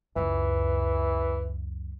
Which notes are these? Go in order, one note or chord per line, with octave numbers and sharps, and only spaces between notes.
C#2 F#2 E3